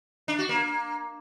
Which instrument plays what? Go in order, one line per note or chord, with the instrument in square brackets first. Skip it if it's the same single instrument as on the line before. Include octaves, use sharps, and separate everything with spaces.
[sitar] D4
F#4
A#3